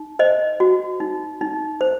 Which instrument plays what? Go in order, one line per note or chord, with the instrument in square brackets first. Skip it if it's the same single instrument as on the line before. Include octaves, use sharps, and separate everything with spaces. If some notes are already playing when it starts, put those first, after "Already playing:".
Already playing: [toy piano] D#4
C5 D#5
F#4
D#4
D#4
C5